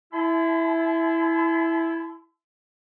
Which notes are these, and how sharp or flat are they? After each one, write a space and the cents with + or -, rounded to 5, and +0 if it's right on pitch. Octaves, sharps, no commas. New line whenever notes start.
E4 +0 A5 -45 C6 -45